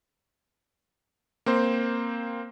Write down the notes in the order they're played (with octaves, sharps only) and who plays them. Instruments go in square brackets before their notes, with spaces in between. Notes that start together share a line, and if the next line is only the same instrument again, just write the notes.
[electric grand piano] A#3 C4 C5